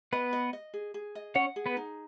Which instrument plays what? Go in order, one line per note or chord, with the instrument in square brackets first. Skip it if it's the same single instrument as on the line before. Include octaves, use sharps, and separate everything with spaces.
[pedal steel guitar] B3 B4 [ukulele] D#5
[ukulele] D#5
D#5
G#4
G#4
D#5
[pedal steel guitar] C#4 C#5 [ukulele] F#5
[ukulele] G#4
[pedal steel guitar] B3 B4
[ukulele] D#4